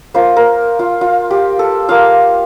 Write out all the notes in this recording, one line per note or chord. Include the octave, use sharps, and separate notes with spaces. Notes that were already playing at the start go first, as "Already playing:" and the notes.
A#3 F4 C5
A#4
F4
F4
G4
A4
A#3 F4 F5